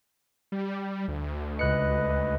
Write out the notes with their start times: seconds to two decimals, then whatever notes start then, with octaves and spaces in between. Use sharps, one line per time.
0.52 G3
1.08 D2
1.59 C#2 B4 D#5 F#6 C#7